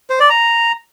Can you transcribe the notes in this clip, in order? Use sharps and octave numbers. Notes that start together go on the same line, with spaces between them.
C5
D5
A#5